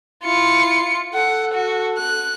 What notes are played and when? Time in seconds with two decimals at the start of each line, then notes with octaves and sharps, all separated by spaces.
0.24 E4 F4 C#7
1.14 A4 F#5
1.54 F#4
1.98 F#6